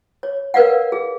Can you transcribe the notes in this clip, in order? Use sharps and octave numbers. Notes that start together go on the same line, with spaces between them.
C#5
A#4 B4 D5 F5 F#5
G#4